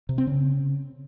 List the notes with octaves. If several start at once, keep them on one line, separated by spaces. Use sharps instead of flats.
C3
C4
C#3